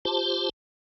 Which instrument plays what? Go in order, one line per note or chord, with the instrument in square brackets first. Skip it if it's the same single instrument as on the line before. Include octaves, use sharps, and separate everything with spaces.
[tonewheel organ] F4 G4 C5 A5